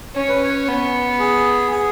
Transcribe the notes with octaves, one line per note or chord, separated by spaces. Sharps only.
C#4 C#5
B4
C#5
B3
G#4
G#4